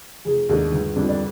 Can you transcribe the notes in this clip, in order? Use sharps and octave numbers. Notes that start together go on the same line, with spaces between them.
F1 G#4
D#2 D#3 G#3 D4
G1
F2 D3 G3 D4
D5